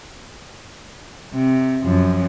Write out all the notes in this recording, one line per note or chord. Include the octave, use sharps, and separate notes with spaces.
C3
F#2 F3